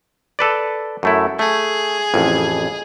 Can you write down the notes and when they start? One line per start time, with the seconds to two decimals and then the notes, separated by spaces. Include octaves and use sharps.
0.39 A4 B4 D5
1.03 F#2 A3 E4
1.39 A3 G#4
2.14 A1 F2